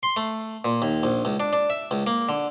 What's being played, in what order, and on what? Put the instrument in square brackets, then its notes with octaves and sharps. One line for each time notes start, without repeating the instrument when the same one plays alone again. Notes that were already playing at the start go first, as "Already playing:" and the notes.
[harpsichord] C6
A3
A#2
D#2
A#1
C#2
D4
D4
E5
C#2
A#3
D3